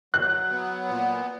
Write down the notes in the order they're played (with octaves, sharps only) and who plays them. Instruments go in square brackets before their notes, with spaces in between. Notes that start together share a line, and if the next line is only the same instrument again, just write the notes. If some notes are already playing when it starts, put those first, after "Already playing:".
[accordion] F#3 [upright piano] F#6
[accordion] B3
A#2